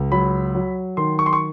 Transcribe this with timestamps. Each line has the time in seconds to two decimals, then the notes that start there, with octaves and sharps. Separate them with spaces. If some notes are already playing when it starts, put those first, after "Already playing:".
Already playing: C#2
0.11 F#3 B5
0.55 F#3
0.97 D#3 C6
1.19 C#6
1.26 C6
1.33 C#6